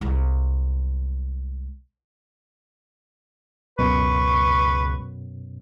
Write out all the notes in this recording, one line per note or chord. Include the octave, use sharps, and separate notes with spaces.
C2 G#3
C#2 F#2 B2 B4 C#6